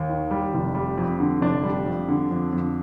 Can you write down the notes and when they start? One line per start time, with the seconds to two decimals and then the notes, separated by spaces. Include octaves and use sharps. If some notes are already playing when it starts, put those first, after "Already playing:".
Already playing: D#2
0.09 D#3
0.31 G3
0.54 F1
0.75 G3
0.98 F2
1.20 D3
1.41 F1 D4
1.63 G3
1.86 F2
2.09 D3
2.31 F2
2.53 F2